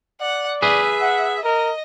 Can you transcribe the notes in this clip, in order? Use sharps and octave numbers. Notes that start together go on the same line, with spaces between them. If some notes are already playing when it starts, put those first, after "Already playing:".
D5 F#5
G#4 B4 E5
F#5
A#4 D#5